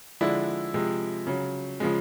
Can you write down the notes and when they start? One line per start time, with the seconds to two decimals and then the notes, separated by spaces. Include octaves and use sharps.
0.21 D3 F3 G#3 D4 E4
0.74 C3 F3 G#3
1.27 C#3 F#3
1.80 C#3 F3 G#3